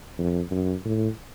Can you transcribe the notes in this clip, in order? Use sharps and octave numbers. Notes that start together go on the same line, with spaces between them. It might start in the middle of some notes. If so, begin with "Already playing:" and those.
F2
F#2
A2